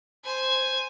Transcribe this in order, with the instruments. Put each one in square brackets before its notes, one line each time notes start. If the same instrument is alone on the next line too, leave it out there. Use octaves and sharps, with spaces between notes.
[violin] C5 G#5